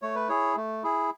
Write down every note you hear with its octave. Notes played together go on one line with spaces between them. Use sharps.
A3 C#5
B4
E4 G#4 C#5
A3
E4 G#4